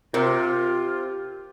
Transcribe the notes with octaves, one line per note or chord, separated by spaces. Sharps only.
C3 F4 A#4 C5